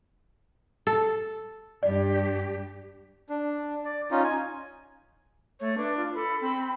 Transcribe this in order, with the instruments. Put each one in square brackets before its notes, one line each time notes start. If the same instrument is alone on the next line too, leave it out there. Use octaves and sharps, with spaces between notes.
[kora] A4
[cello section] G2 G4 [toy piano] D5
[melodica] D4
D5
C#4 D#4 F4
G#5
[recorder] A3 [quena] C#5
[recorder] D4 [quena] B4
[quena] F4
[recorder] A4 [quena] B5
[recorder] C4